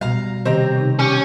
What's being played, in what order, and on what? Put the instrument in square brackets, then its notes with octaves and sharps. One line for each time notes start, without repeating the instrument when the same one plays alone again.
[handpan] B2 G3 [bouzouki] F5 A#5
[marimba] C3 D#3 D#5 [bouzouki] C4 G4 A#5
[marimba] C3 D#4
[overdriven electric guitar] C#4 [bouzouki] G4 [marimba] G#5